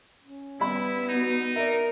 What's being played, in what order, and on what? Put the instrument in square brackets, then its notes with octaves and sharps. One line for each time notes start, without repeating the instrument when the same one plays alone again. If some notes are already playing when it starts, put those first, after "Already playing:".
[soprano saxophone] C#4
[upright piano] G3 B5 [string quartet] B3 [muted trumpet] E4
[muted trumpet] D#4 [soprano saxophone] F#4
[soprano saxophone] A#4 [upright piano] D5 E5